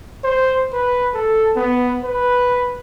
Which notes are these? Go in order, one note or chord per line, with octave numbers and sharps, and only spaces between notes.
C5
B4
A4
B3
B4